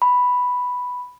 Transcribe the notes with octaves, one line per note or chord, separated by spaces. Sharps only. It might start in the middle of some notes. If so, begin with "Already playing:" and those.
B5